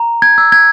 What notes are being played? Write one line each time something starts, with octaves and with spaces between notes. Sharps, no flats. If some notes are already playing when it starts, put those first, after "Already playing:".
Already playing: A#5
G#6
E6
G#6